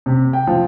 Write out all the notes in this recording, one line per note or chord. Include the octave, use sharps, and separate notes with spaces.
C3
G5
F3